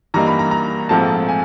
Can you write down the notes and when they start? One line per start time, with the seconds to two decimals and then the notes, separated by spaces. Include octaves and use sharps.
0.14 G2 E3 G3 A#3 D#4 A#5
0.27 B5
0.39 A#5
0.51 A#5
0.89 A#1 G#2 F3 A3 C4 A5
1.28 G#5